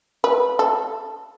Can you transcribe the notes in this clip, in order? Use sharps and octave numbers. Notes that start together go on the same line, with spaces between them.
B4
A4